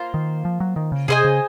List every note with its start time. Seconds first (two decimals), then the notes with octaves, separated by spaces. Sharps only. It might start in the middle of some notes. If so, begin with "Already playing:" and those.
Already playing: A#3 F4 C5
0.14 D#3
0.45 F3
0.60 F#3
0.76 D#3
0.92 C#3
1.08 C3 G#4 C5 D#5 G#5
1.24 C#3